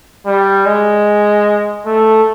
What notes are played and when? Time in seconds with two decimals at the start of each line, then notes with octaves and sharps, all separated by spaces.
0.27 G3
0.66 G#3
1.86 A3